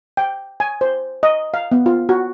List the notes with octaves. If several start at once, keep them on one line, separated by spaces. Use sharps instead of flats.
G5
G#5
C5
D#5
F5
B3
F4
F#4